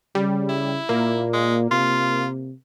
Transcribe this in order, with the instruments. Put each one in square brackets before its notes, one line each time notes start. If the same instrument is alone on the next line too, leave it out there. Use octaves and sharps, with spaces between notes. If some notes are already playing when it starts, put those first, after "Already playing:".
[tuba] C#3 [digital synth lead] G3
[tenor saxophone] E4
[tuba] A#2 [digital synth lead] A#3
[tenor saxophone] G#3
[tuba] C3 [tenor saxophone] F4